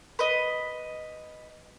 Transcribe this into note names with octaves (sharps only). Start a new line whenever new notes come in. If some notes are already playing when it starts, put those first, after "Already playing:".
B4 D#5